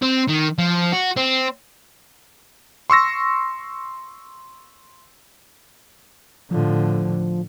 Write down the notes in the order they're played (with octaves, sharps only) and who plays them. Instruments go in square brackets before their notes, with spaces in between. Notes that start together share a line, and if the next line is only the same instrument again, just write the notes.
[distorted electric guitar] C4
D#3
F3
F#4
C4
[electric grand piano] C6 C#6 E6 A#6
[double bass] A2 D3 [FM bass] F3